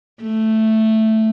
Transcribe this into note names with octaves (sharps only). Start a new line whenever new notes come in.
A3